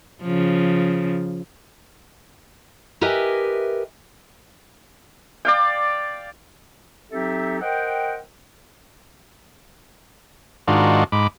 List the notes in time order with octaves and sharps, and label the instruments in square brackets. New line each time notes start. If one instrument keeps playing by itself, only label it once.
[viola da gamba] C#3 F3
[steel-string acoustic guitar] G4 A#4 B4 D#5 E5 G#5
[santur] D5 F5 G5
[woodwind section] F#3 C4 D#4 G4 A4 E5
A#4 C5 D#5 F#5 G5
[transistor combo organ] G#2 D#3 D4 F4 F#4
G#2 B5 D6